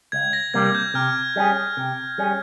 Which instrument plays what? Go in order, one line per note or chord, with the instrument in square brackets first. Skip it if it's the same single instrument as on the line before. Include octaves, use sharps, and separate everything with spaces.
[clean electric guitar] C#2 [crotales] G#6
[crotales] A#6
[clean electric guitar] C3 G3 A#3 [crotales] G#6
[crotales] G6
[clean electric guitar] C3 [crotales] F6
[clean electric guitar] G3 C#4 G#4
C3
G3 C#4 G#4